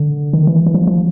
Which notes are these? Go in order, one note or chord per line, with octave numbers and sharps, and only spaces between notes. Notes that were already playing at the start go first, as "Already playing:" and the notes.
Already playing: D3
D#3
E3
E3
F3
F3